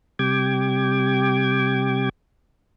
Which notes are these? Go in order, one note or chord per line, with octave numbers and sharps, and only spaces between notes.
C3 G3 G5 D6 G#6